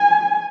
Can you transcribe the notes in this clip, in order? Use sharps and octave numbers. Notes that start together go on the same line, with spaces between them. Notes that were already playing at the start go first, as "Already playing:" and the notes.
Already playing: G#5